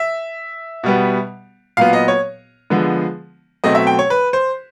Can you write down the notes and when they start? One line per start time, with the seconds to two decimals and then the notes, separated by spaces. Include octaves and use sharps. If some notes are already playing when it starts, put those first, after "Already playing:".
Already playing: E5
0.84 B2 G3 B3
1.77 A#2 F#3 B3 F5
1.93 D#5
2.08 C#5
2.70 D3 F3 G#3 B3
3.64 B2 F#3 A3 C4 D#5
3.75 E5
3.87 G5
3.99 C#5
4.10 B4
4.33 C5